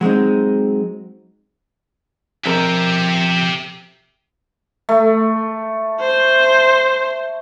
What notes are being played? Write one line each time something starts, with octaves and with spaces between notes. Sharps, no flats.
F#3 G#3 C4 D#4
F2 G4 A#4 E5
A3
C5